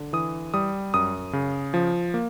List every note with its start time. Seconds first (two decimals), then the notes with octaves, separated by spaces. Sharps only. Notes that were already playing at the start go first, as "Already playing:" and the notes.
Already playing: D3
0.13 E3 D#6
0.54 G3 D#6
0.94 F#2 D#6
1.33 C#3
1.74 F3
2.14 A#3